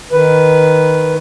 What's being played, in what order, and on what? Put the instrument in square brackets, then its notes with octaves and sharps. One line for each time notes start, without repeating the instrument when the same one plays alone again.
[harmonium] D#3 B4